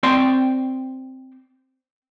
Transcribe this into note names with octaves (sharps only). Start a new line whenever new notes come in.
C4 C5 D5 G5 C6